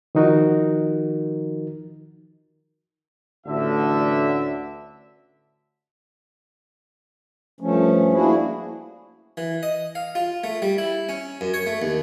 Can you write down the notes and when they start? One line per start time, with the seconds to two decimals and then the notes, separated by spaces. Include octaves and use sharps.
0.15 D#3 F3 D#4 F#4 A#4
3.46 A1 D2 D3 E5
7.61 G2 F3 A3 C#4
8.13 A#3 D4 E4 F#4 G#4
9.37 E3
9.63 D#5
9.95 F5
10.15 F4
10.44 A3
10.62 G3
10.78 E4
11.09 C#4
11.41 F#2
11.54 C#5
11.67 A3
11.82 D#2